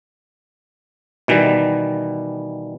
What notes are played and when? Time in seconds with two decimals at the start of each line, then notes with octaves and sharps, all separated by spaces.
1.28 B2 D#3 E3 G3